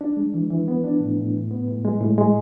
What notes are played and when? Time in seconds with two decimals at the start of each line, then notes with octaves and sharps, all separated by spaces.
0.01 D4
0.17 G#3
0.34 E3
0.50 E3
0.68 B3
0.84 D4
1.00 A2
1.17 A2
1.35 A2
1.51 B3
1.68 A2
1.85 G#3
2.01 A2
2.18 G#3